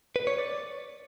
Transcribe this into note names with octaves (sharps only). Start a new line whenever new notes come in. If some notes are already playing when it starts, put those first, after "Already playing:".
B4
C#5
D5